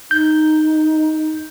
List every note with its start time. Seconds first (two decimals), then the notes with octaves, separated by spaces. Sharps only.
0.11 D#4 G6